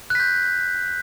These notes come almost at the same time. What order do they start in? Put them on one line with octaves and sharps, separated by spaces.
F#6 B6 G6